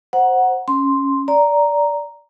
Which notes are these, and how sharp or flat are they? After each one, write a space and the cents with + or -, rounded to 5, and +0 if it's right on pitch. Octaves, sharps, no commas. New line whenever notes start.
C5 +0 F#5 +0 A#5 +35
C#4 +0 C6 +0
D5 -15 A#5 +0